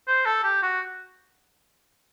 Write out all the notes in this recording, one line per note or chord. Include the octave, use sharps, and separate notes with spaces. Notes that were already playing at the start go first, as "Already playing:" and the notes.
C5
A4
G4
F#4